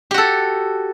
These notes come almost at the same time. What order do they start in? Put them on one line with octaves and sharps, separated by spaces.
G4 F#4 A4